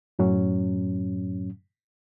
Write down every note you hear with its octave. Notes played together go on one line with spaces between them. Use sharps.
F#2 A2 F#3 C#4